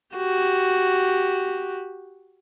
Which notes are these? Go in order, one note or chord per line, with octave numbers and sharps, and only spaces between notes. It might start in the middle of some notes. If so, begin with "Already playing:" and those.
F#4 G4